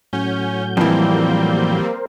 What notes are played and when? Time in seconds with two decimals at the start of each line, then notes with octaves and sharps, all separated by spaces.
0.13 A2 F#3 C#4 G6
0.77 F2 E3 G3 A#3 C4
1.83 A#4 C5